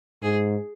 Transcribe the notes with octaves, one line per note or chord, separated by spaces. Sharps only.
G#2 G#4